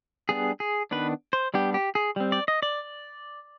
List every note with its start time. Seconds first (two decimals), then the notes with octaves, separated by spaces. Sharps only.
0.29 G3 B3 D4 G#4
0.60 G#4
0.91 D#3 B3 D4 B4
1.33 C5
1.54 G3 B3 D4 G4
1.74 G4
1.95 G#4
2.16 G3 C4
2.32 D5
2.48 D#5
2.62 D5